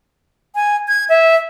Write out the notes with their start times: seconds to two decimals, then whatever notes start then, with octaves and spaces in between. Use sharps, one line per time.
0.55 G#5
0.88 G#6
1.09 E5